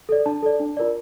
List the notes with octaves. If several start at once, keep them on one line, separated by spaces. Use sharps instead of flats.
A4 D5
D4 A5
A4 D5
D4
F4 A#4 D5